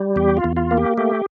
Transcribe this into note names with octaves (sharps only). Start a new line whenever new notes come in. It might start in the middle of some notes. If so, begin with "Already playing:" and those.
Already playing: G3
E2 G4
F4
E2
F4
A#3
G4
A3 G4